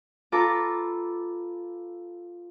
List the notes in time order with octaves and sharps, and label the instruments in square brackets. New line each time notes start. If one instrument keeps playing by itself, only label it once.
[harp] F4 A4 B4 A#5 D6